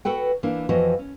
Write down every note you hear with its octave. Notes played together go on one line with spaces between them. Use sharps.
F#4 A4 B4 G5
E3 A#3 D4
F2 E3 F3 F#4 D#5
C#4